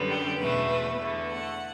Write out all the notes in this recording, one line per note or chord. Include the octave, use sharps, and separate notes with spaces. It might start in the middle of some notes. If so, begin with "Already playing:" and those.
Already playing: F#2 D3 G3 B3
G4
E2 B2 A3 B4
B4
E2 D3 A3
F#5